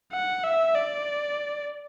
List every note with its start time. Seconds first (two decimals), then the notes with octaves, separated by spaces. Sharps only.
0.12 F#5
0.44 E5
0.75 D5